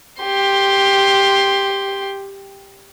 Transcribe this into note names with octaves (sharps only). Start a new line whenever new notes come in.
G4 C6